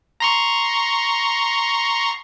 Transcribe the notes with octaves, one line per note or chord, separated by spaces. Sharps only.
A#5 C6 C#6